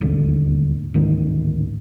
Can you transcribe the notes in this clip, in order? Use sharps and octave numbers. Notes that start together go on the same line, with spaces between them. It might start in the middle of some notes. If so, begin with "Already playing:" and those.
D#1 G#1 D2 D3
A1 D2 G#2 D#3